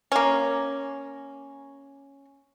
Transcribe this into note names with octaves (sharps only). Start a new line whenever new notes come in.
A#3 C#4